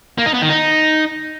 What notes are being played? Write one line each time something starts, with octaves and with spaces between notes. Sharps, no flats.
A#3
D#4
B3
D#3
D#4